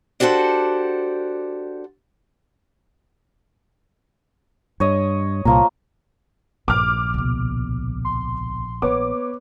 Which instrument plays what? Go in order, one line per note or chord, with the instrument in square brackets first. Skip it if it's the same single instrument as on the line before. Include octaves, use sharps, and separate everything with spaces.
[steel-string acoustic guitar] D4 F#4 G4 A4 C5 F#5
[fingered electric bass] G2 [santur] C#5 D#5
[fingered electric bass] C2 A#2 [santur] F3 A#3 A#5
[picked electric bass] A#1 [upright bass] G2 [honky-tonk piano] D6 F6
[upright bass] C#2 B2
[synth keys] C6
[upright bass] A#3 [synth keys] B3 B4 C#5 [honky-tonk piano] D6